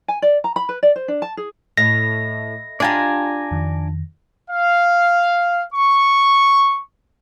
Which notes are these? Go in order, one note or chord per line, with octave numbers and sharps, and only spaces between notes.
G#5
D5
A#5
B5
B4
D5
C5
D4
A5
G#4
A2 D#5 E5 A#6
D4 F4 G4 D5 G#5 A#5
F2 D#3
F5
C#6